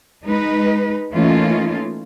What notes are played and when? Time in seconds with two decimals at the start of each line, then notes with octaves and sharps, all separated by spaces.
0.24 G#3 D#4 B4
1.13 E3 A3 A#3 C#4 D#4 F4